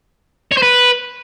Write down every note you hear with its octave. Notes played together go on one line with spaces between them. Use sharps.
C#5
C5
B4